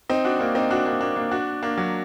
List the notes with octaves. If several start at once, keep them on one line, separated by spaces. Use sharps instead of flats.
C4 D#4
D4 F#4
A#3 D4
C4 D#4
D4 F#4
A#3 D4
A#3 D4
A#3 D4
D4 F#4
A#3 D4
F#3